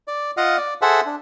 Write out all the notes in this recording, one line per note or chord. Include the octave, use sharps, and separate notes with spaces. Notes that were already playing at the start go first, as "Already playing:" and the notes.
D5
F4 D#5 F5 F#5
D5
G#4 A4 C5 E5 F#5
D4